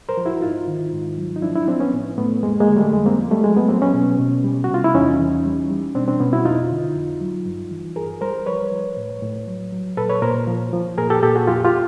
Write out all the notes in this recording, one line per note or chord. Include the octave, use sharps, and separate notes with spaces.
A#4 C5
F3
E4 F#4
G#2 D#4 F4
D#3
G#2
F#3
D#4
F3 D4 E4
D4 E4
D#4
F3 C4 D4
B3 C#4
A2
A2 A3 B3
F2 G#3 A#3
G#3 A#3
D3
G3 A3
F2 G#3
A#3 C4
F3
G3 A3
F#3 G#3
A3 B3
F#3 A#3 C4
B3 C#4
B2
B2
G3
F#4
C3 F4
E4
E2 C#4 D#4
E3
G3
G3
B2 C4 D4
C4 D4
B2 B3 C#4
E4 F#4
F2 D#4 F4
D3
F2
F#3
G2
E3
G2 G#4 A#4
G3 A#4 C5
F3 B4 C#5
F3
A2
A2
F#3
F#3
A#2 A4 B4
B4 C#5
A#2 A#4 C5
F3
F3
A#2 G#4 A#4
G4 A4
A#2 G4 A4
F#4 G#4
F2 F4 G4
F4 G4